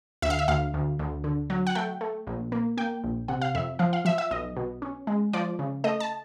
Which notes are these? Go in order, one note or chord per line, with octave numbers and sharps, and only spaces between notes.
D2 E5
F5
E5
D2 F5
D2
D2
D3
F#3
F#5
A3 G5
A3
A#1
A#3
A#3 G5
A#1
C3 F#5
F5
F2 E5
F3 F5
F5
F3 E5
E5
B1 D#5
B2
C#4
G#3
F3 D5
C#3
A3 D#5
A5